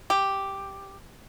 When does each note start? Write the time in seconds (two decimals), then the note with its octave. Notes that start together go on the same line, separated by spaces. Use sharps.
0.10 G4